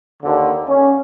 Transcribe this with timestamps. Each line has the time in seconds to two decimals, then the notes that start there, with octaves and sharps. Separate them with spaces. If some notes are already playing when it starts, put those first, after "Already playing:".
0.22 D#2 D3
0.67 C#4